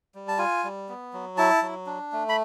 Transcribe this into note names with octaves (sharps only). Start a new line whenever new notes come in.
G3
A5
F4 G#5
G3
B3
F#3
E4 A5
F#3
D4
A3
B5